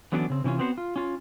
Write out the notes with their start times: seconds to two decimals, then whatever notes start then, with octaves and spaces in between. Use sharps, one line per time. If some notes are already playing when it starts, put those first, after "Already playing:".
0.12 D3 E3 F#3 B3 C#4 D4
0.30 C#3 C4
0.44 C3 E3 C#4 F4
0.59 B3 C4 F#4 C5 C#5
0.78 F4
0.96 C#4 F4